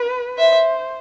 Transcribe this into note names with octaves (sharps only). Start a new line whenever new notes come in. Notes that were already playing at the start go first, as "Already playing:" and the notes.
Already playing: B4
C5 E5